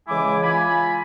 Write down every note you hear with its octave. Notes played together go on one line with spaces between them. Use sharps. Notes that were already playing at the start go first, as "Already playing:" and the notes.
C#3 E3 G#3 E4 G#5 D6
F4 G#5 B5